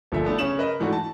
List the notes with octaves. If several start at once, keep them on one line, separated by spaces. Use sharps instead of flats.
G1 A#2 D3 F3 E5
A3 B3 D4 E4
C#3 C#4 E7 F#7
A#4 B4 D#5
G#2 E3 A3 D4 F#4
A5